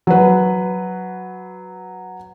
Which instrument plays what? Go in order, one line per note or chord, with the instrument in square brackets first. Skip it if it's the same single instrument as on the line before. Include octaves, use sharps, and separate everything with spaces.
[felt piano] F#3 B4